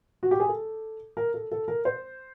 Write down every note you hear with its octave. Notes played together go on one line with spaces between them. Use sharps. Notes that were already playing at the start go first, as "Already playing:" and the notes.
F#4
G4
G#4
A4
A#4
A4
A4
A#4
C5